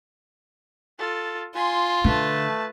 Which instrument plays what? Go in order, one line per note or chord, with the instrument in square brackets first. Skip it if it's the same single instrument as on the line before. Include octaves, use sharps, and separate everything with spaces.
[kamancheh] F4 A4
[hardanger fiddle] F4 [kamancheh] G#5 C6
[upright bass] D3 [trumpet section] A3 [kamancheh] B4 A5